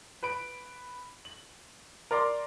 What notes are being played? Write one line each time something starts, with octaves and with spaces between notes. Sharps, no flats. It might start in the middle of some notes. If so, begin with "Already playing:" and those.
B4 B5 D7
F#7
A#4 D5 A#5 C6 D6